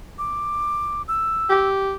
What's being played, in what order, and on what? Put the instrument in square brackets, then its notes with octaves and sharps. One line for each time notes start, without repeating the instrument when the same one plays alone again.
[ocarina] D6
E6
[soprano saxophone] G4